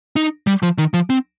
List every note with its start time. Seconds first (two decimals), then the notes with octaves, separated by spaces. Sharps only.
0.16 D#4
0.47 G3
0.63 F3
0.78 D#3
0.94 F3
1.10 C4